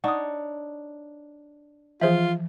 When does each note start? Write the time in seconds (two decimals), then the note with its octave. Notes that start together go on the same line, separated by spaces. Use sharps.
0.04 D4 D#4 C#5 F#5 D#6
2.01 E3 F3 F4 G#4 C5 E5